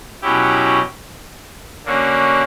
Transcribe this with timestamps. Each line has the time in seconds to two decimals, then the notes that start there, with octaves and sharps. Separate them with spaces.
0.22 B2 F#3 C#4 E4 G4
1.85 D3 A#3 C#4 F#4